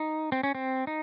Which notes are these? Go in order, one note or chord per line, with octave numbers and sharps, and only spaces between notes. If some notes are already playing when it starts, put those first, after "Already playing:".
Already playing: D#4
C4
C#4
C4
D#4